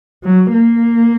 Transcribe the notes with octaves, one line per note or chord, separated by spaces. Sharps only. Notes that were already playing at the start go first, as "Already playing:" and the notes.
F#3
A#3